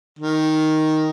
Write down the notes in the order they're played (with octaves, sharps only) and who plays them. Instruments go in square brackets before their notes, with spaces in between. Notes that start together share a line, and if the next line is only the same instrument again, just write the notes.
[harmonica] D#3